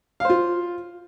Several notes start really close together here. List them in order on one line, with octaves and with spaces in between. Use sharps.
F5 C5 F4